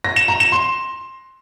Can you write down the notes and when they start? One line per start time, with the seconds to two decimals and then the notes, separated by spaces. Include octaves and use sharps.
0.04 A#6
0.16 E7
0.28 A#5
0.40 E7
0.52 C6